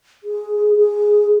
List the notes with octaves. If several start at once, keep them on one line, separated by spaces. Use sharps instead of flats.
G#4
G#4